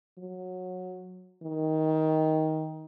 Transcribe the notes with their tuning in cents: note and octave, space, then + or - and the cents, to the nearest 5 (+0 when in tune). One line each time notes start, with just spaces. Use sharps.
F#3 -15
D#3 +15